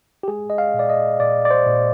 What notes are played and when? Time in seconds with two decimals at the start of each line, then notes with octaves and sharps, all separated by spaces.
0.23 G4
0.28 G#3 G#4
0.50 D#5
0.58 F5
0.74 A#2
0.79 D5
0.89 D#5
1.20 A#2 D5
1.45 D5
1.51 C5
1.67 A#2